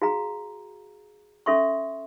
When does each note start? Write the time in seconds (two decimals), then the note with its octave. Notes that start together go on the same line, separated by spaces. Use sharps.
0.02 F#4 G#4 F5 A#5
1.46 C#4 A4 E5 C6 C#6